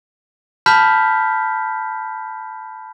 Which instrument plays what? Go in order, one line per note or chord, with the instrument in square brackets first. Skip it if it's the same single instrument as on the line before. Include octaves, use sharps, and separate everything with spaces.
[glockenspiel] A5 B5 F6 G6 B6